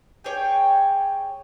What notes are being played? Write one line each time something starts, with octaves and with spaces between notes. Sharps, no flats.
G4 G#4 C#5 G5